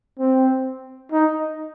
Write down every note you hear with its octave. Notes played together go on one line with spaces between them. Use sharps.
C4
D#4